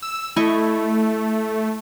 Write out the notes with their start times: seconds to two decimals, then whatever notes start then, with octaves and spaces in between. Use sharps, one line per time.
0.03 E6
0.36 A3 E4 D#5 C#6